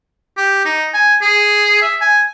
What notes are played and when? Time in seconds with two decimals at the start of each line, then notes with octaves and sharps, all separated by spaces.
0.37 G4
0.65 D#4
0.94 G#5
1.22 G#4
1.82 E5
2.01 G#5